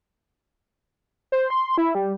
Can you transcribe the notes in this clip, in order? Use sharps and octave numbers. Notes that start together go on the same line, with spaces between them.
C5
C6
E4
G3